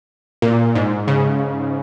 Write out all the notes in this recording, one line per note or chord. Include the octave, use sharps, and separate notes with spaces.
A#2
G#2
C#3